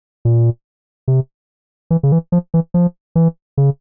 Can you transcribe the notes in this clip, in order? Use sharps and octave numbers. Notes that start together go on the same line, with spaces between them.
A#2
C3
E3
C#3
E3
F3
E3
F3
E3
C#3